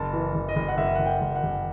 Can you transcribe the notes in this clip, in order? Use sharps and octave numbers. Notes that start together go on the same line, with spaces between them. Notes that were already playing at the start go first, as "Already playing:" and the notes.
Already playing: F#1 A5
E3
F#1
D#5
F#1
F#5
F#1 E5
F#1 F#5
G5
F#1
F#5
F#1